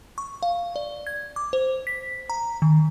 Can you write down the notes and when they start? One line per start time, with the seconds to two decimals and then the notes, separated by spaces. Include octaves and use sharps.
0.18 C#6
0.43 F5
0.76 D5
1.07 G#6
1.36 D6
1.53 C5
1.87 B6
2.30 A#5
2.62 D#3